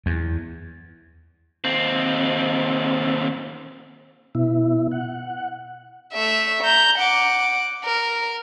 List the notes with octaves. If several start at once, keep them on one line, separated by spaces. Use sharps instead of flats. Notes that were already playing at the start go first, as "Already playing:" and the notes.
E2
D#2 C4
B2 E4
F#5
A3 E5
A#5 G6
F#5 D6
A#4